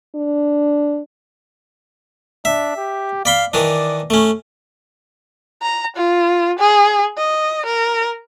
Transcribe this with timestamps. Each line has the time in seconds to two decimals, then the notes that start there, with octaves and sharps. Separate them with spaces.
0.15 D4
2.45 D4 E5
2.77 G4
3.25 D5 F5 B5 C6
3.54 D#3 E3 D4 D5
4.10 A3 C#4
5.62 A#5
5.96 F4
6.59 G#4
7.17 D#5
7.66 A#4